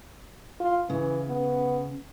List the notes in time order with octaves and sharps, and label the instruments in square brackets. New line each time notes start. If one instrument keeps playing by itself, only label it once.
[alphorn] F4
[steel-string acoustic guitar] C#3 [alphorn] E3
[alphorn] B3